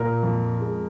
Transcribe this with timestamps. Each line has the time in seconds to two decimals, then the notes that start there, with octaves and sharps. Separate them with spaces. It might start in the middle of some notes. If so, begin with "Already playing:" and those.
Already playing: A#2 A#4
0.23 F2
0.61 G#3